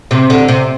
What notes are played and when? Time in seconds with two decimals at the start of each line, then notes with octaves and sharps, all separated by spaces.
0.11 C3
0.30 D3
0.48 C3